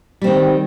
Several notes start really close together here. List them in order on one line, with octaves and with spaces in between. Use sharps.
G3 C4 D#3